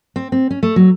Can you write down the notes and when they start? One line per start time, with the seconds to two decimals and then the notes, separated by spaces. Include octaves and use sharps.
0.16 C4
0.32 C4
0.51 C#4
0.63 A3
0.76 F#3